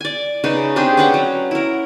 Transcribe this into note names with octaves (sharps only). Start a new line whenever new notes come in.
D5 G#5
C#3 D#4 B4
C4 D4 G4 G#4
C#4 B4 F#5 G5
F#3
E4 A#4